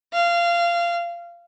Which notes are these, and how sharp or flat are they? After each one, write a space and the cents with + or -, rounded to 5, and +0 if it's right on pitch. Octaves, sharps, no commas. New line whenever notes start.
F5 -20